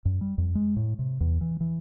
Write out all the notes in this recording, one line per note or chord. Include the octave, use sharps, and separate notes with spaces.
F#2
G3
F2
G#3
A2
C3
E2
E3
E3